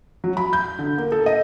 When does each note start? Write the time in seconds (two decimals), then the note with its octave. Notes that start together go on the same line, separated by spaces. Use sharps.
0.24 F#3
0.37 B5
0.53 G6
0.79 D3
0.98 A#3
1.12 A4
1.26 D#5